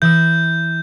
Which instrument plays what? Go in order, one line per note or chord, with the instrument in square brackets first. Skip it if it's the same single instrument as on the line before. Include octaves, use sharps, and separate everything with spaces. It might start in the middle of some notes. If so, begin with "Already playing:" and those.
[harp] E3 E6 [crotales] G6